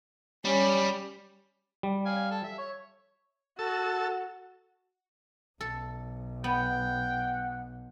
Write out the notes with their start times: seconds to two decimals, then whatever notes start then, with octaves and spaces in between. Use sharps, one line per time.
0.45 G3 C#4
1.83 G3
2.06 F5 G#5
2.31 A4
2.44 E5
2.58 C#5
3.59 F#4 A4 E6
5.61 B1 A4
6.44 B3 F#5 G5